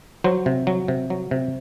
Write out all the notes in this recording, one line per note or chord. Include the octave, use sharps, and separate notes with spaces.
F#3 C5
C3
F#3
C3
F#3
C3